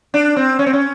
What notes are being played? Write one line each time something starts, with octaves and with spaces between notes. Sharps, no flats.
D4
C4
C#4
C4
C#4